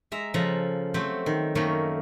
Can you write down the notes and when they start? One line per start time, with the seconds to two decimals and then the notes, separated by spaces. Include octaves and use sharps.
0.12 G#3 E5 A#5
0.34 C#3 F3 A4 A#5
0.94 F#3 A3 C4 G4
1.26 D#3
1.55 F#2 D#3 A3 A#3 C#5